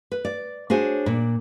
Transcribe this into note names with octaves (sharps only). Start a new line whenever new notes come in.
B4
D5
D4 F#4 G#4 C5 C#5
A#2 D4